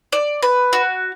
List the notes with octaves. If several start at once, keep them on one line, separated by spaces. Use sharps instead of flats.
D5
B4
F#4